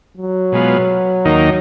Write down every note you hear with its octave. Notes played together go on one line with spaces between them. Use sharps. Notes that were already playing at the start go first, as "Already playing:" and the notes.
F#3
B2 G#3 B3 F4
D#2 D#3 A#3 D#4